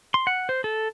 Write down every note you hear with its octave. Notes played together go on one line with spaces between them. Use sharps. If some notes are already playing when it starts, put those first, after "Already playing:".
C6
F#5
C5
A4